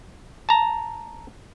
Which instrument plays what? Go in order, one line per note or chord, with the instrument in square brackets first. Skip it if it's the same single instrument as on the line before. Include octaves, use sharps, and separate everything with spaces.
[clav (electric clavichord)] A5 A#5